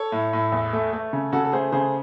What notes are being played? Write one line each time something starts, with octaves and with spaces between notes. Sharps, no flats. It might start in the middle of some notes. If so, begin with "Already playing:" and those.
Already playing: A4 C#5
A2
A2
E2
A3
A3
C#3
C#3 F#4 A4
A4
A3 G#4 C5
C#3 G#4 C5